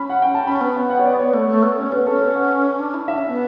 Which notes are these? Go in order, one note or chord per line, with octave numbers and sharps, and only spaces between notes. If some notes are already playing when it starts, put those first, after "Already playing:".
Already playing: C#4 B5
F#5
G5
A5
C#4 B5
B3
G5
F#5
C#5
D5
C#5
A3
A3
B3
C#4 C#5
B3 B4
C#4 A4
B4
F#5
D4
E4
D4 E5
C#4
B3